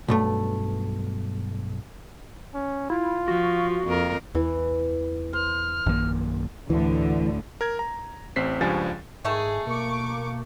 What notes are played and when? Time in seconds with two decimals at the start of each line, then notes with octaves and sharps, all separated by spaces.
0.08 B1 G2 A3
2.54 C#4
2.90 E4 F4
3.28 F3 F#4
3.87 F2 A#3 A#4
4.35 E2 E3
5.33 C5 F6
5.86 A#1 F#2 D#3 A#3
6.70 D2 A2 D3 E3
7.61 A#4 G#6
7.79 A#5
8.36 A1 C4 C5 B6 C7
8.61 C#2 G2 F3 G3 G#5 A6
9.25 G#2 D#3 A3 G#4 A5
9.67 B2 A#3 C#6 D6